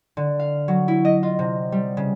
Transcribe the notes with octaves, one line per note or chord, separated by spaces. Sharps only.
D3
F5
F#3
E4
D#5
F4
C3
G3
C#3